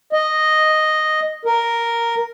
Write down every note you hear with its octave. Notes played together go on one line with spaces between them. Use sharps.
D#5
A#4